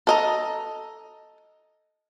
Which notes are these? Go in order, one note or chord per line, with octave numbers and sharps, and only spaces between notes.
A4 D#5 A#5